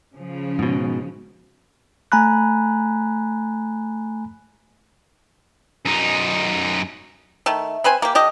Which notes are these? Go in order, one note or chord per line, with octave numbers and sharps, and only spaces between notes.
C#3 F3
G#2 B2
A3 G#5 A#5 B5 F#6
F#2 D#4
D#3 A3
C4 B4 C5 G#5
A#3 G4
D3 G4 D#5